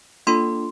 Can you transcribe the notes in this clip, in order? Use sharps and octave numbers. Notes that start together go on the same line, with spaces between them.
A#3 D4 F4 A4 C6